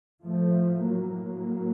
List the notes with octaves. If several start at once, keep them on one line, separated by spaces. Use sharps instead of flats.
A2 F3 A3
F#3 A#3
F#3 A#3